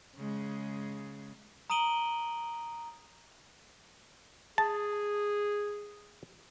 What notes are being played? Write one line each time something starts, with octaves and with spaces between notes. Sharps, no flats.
C#3 G#3
A#5 D#6 D7 D#7 F#7 G7
G#4 A5